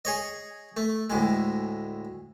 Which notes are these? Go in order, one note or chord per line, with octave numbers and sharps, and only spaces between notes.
G#4 C#5 D#5
A3
D2 A2 G#3